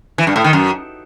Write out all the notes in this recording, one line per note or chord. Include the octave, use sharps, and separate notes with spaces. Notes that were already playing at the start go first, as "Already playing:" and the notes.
E3
G2
A2
D#3
F#2